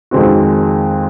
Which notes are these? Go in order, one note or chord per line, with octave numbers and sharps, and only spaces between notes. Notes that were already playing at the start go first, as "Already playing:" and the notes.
F2 D#3 G#3 C4 F#4